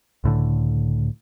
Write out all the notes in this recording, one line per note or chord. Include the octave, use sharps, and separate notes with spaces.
C#2 A2 D3